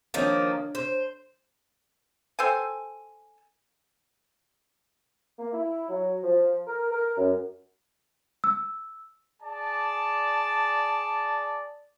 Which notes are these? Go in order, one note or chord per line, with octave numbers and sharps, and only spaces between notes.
D#3 F3 A#3 D4 C#5
C5
A4 C5 G5 G#5
A#3
E4
F#3
F3
A#4
A#4
F#2
E6
G#4 D5 A5